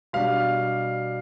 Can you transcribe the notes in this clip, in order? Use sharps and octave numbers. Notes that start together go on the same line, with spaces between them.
B2 G3 D4 F5